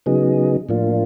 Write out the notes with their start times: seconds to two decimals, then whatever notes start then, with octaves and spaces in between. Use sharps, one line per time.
0.06 C#3 F#3 B3 D#4 G#4
0.69 A2 F3 A#3 D4 F4